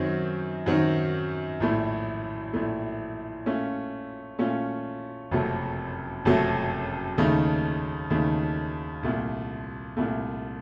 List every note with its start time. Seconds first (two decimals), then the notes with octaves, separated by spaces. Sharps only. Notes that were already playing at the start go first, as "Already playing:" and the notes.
Already playing: F#2 D#3 F#3 C4
0.66 F#2 D#3 F#3 C4
1.60 A#1 A2 A3
2.53 A#1 A2 A3
3.46 A#2 A3 C#4 F4
4.39 A#2 A3 C#4 F4
5.31 F#1 F2 C3 F#3 A3
6.25 F#1 F2 C3 F#3 A3
7.18 D#2 C#3 A3 D#4
8.10 D#2 C#3 A3 D#4
9.03 C2 A#2 A3
9.97 C2 A#2 A3